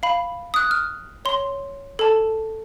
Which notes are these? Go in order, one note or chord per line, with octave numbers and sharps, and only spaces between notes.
F5 B5
D#6 F#6
F6
C#5 C6
A4 A5